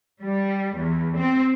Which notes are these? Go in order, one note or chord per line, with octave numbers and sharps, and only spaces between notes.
G3
E2
C4